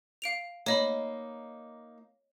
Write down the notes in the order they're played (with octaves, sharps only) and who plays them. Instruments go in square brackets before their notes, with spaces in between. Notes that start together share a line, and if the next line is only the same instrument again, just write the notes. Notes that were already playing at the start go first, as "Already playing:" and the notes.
[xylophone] F5 D7 F7
[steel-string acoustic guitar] A#3 D#4 [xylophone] C#5 D#5 B5